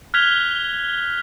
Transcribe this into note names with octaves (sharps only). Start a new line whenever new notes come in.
F6 F#6 G#6 B6 F7 G7